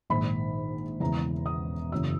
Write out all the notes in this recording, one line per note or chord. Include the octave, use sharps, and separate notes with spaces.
A#1 G#2 D#3 B5
E1 E2 C#3 E3 A#5
D#6
F#1 F#2 C#3 E3 E6